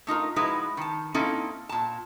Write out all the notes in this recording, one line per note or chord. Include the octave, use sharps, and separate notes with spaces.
A3 D#4 F4 A#4
F3 G#3 D#4 E4 F#4 B4
D#3 A5
A#3 C4 C#4 D#4 E4 A4
A#2 A5